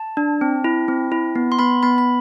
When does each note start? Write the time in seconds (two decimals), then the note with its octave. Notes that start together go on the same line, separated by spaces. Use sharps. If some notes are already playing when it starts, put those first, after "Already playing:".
Already playing: A5
0.17 D4
0.41 C4
0.64 E4
0.88 C4
1.12 E4
1.35 B3
1.52 C6
1.59 B3 B5
1.83 B3 B5
1.98 B5